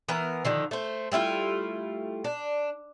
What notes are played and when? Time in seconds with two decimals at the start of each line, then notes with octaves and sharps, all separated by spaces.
0.08 E3 B3 A#4
0.45 D3 D#3 F3
0.71 A3 C5
1.12 G3 A3 E4 F4
2.24 D4